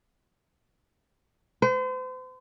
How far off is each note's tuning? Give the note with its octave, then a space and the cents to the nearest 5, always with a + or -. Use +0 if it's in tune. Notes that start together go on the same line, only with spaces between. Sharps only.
C5 -40